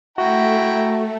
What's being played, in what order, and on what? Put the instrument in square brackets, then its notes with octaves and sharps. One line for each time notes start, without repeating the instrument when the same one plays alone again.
[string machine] A3 [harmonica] E4 G5 A#5 [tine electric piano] F#4